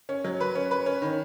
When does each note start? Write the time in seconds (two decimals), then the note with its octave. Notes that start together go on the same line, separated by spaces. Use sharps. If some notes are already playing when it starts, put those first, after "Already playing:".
0.09 C#4
0.24 F#3
0.41 B4
0.55 C#4
0.71 B4
0.86 C#4
1.02 D#3